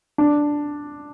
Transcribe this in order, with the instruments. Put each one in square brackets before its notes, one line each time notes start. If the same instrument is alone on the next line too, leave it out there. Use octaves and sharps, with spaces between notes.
[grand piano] D4